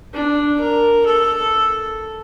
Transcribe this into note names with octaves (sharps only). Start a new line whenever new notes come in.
D4
A#4
A4